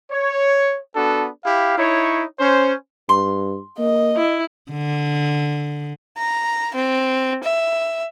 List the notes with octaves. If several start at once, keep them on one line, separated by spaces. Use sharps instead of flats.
C#5
B3 D4 F#4 A4
E4 G4 F5
D#4 E4 C#5
C#4 C5
G2 C6
A#3 D#5
E4
D3
A#5
C4
E5